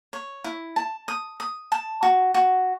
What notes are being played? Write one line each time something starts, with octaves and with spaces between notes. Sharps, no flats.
C#5
E4
A5
D#6
D#6
A5
F#4
F#4